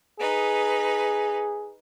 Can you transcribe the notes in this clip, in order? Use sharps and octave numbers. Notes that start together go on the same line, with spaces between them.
D#4 G#4 B4